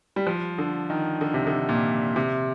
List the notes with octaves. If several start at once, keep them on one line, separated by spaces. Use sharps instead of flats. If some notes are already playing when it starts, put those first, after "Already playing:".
G3
F3
D3
D#3
D3
C3
D3
A#2
C3